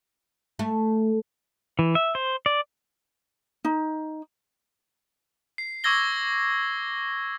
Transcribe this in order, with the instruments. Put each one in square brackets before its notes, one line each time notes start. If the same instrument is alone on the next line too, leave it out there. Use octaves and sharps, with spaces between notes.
[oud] A3
[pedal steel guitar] E3
E5
C5
D5
[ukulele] D#4
[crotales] C7
C#6 D6 E6 G#6 A#6 G7